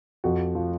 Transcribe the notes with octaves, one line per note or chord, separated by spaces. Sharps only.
F2 F#4
F3